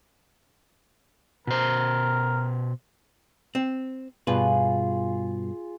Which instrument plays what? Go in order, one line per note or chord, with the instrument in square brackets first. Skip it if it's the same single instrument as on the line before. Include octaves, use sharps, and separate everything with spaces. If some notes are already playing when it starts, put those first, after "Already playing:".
[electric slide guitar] B2 C5 [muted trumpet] A#4
[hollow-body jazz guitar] C4
[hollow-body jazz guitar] G2 B2 B4 [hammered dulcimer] F4 G#4